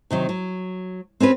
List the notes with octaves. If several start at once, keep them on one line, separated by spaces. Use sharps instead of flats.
C3 D#3 F#3
F#3
C4 C#4 G4 B4